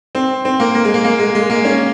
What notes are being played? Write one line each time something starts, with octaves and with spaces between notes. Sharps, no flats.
C4
C4
A#3
A#3
G#3
A#3
A#3
G#3
G#3
A#3
C#4